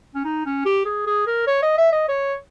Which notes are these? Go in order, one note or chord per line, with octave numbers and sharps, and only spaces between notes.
C#4
D#4
C#4
G4
G#4
G#4
A#4
C#5
D#5
E5
D#5
C#5